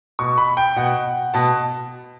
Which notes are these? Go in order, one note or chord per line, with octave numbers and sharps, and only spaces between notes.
B2 C#6
B5
G5
B2 F#5
B2 A5